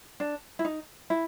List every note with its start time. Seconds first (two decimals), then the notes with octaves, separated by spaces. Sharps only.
0.20 D4
0.59 E4
0.65 D#4
1.10 E4